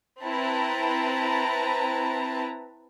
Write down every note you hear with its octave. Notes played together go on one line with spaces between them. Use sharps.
C4 E4 B4 A5 A#5